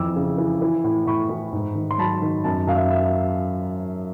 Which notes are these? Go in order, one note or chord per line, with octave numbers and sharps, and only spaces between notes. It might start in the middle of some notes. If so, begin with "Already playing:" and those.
Already playing: F2 E3 D6 E6
C#3
E3
E3
A2
A2 B5 C#6
E3
G#2
D#3
C6
F#3 A5 B5
D#3
F#2 A5 B5
F#2 F5
E5
E5